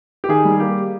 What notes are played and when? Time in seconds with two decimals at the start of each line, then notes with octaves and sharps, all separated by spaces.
0.24 G4
0.29 D#3 G#4
0.45 G3
0.60 A#3 G4